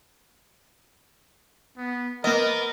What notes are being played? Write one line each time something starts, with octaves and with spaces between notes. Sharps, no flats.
B3
A#3 B3 A#4 D#5